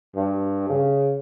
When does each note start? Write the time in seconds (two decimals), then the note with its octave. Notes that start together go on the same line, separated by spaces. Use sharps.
0.16 G2
0.70 C#3